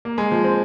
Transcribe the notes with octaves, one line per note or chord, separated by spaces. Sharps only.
A#3
G#3
F3
C4